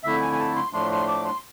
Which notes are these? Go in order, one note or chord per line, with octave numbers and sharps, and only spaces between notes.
F2 D3 A3 E4 E5
G#5
G#5
A5
C6
A2 F3 A3 D4 C6
C6
D6
C6